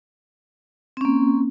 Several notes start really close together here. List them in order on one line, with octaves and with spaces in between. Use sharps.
C4 C#4 A#3